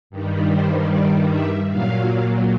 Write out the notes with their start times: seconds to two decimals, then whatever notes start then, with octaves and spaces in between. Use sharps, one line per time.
0.10 G2 D#3 G3
0.51 C5
0.90 D5
1.30 E5
1.70 A#2 F#3 F5